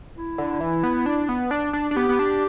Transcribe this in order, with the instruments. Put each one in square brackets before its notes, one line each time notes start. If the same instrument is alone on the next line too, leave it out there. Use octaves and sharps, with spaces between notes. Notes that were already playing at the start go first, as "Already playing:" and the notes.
[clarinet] E4
[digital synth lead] D3
E3
B3
D4
B3
D4
D4
D4
[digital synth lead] B3 [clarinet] G4
[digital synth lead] B3
D4